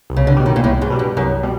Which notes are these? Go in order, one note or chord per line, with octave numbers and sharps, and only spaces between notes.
C2
C#3
D3
B2 G3
D#3
A#2
C2 A2
G#2
B2 G3
G2
C2 F#2
B2 G3